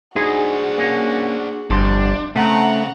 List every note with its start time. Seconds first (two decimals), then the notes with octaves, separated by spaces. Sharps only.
0.16 D4 D#4 F#4 G#4 C5
0.78 A#3 C#4
1.70 G1 F2 G3 D4 C5
2.36 C#3 A3 C4 F#5 A#5